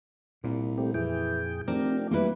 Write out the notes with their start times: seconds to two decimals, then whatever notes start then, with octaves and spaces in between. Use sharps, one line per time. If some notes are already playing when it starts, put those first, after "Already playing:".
0.44 C2 A#2
0.78 A3 C4 G4
0.94 F2 E3 G#4 G5
1.68 F1 C4 D4 G4 A#4
2.11 G3 A#3 E4 B4